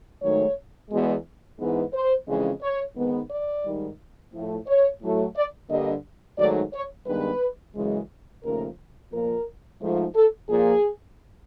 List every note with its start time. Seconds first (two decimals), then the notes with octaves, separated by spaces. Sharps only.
0.22 G#2 D#3 F#3 A3 C#5
0.90 E2 B2 G#3
1.59 G#2 E3 G#3 B3
1.94 C5
2.27 F2 C#3 E3 G#3
2.62 C#5
2.96 G#2 D#3 G#3 B3
3.30 D5
3.65 G#2 D#3 G3
4.33 A2 F3 A3
4.67 C#5
5.01 A2 F#3 A3
5.36 D5
5.69 G2 D3 G3 A#3 D#5
6.38 G#2 D#3 F#3 A3 D5
6.73 C#5
7.06 G2 D#3 G#3 B3 B4
7.75 F#2 C#3 E3 G#3
8.43 D#2 C#3 F3 A3 A#4
9.12 A#2 F3 A#3 A#4
9.81 G#2 F3 A3
10.15 A4
10.49 A#2 F3 A#3 G#4